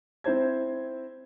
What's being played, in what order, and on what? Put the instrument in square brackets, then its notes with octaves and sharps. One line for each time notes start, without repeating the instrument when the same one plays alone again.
[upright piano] C4 E4 C5 G#6